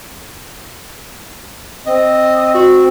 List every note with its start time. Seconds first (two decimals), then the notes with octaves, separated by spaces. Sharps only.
1.87 C4 D#5
2.55 F#4